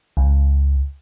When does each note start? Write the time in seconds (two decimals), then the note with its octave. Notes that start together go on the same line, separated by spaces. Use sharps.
0.17 C#2